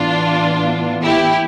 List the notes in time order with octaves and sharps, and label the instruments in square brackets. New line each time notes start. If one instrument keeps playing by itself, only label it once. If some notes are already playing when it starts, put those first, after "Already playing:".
Already playing: [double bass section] A2 E3 B3 [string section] D4 F4
[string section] E4 G4